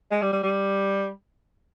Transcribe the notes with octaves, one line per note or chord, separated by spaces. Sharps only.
G#3
G3
G3
G3